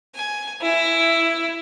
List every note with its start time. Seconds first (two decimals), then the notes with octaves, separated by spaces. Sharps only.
0.15 G#5
0.62 E4